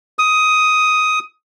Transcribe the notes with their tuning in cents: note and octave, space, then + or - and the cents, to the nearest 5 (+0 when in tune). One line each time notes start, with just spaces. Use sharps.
D#6 +10